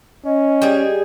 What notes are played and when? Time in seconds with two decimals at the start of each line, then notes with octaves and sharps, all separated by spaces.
0.25 C#4 D#5
0.62 G3 G#4